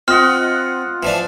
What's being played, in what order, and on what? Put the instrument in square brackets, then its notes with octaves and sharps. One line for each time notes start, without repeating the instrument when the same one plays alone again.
[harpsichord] C4 [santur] F4 D#5 F#5 [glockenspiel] F6
[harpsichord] E3 F3 D4